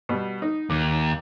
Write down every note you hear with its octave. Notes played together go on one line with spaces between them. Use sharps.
B2 G3
D#4
D#2 D6